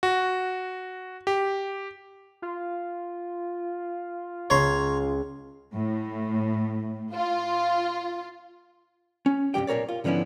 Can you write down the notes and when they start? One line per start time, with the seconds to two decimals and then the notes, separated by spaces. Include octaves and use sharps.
0.03 F#4
1.27 G4
2.42 F4
4.50 C#2 C#5 G#5 A#5 C6 D6
5.74 A2
7.13 F4
9.26 C#4
9.54 C2 G2 F3 G4 G5
9.67 B1 A#2 A#4 C#5 D5
9.89 F4
10.04 G#2 D3 F3 B3 C#4 E4